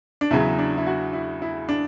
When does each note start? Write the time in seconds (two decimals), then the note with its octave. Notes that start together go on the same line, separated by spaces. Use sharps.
0.21 D4
0.30 E2 C#3 F#3 E4
0.59 D4
0.78 E4
0.86 F#4
1.13 E4
1.42 E4
1.69 D4